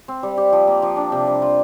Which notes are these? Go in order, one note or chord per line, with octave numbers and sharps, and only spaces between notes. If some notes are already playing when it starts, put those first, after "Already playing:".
C4
G3
G4
F3
A#3
F3
D4
C3
G3
F4